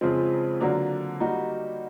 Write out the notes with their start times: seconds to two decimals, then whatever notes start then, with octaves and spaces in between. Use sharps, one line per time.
0.01 F2 C#3 F3 G#3 C4
0.61 D3 F#3 A#3 D4
1.20 G3 A#3 D#4 F#4